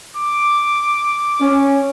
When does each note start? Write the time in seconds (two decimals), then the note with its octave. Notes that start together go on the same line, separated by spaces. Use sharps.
0.17 D6
1.41 C#4